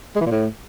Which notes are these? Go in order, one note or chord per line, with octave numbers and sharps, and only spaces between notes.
G#3
E3
A#2
A2